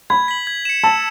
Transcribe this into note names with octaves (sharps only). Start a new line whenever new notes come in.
B5 G#6
B6 F#7
G#6
C#7 E7
A5 E6